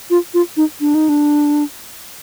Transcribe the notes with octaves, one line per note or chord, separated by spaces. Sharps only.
F4
F4
D#4
D4
D#4
D4